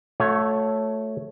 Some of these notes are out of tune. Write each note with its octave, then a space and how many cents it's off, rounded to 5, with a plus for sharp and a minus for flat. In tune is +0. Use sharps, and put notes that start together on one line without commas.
A3 +0 F#4 -40 C#5 +0